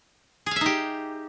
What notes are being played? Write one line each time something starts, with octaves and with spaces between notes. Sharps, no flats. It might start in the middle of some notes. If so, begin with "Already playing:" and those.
D#4 G4 G#4 E5 F5